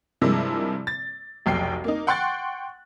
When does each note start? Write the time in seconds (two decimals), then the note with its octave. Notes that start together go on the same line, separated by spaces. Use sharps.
0.21 G2 C3 F3 G#3 A#3 E4
0.87 A6
1.46 F1 B1 G5 C7
1.84 A#3 D#4
2.07 F#5 G5 C6 C#6 F#6 A6